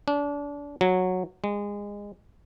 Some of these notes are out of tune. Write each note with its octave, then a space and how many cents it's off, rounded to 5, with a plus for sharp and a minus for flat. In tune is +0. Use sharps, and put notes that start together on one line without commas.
D4 -30
F#3 -10
G#3 -25